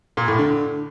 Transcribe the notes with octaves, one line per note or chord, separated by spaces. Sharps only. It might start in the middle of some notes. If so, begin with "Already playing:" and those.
A#2
A2
D3